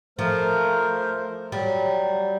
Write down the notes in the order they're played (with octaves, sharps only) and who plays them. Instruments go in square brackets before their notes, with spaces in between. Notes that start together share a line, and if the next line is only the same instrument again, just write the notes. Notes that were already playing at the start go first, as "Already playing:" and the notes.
[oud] F3 [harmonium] A3 A#4 C5
[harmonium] F#3 [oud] G3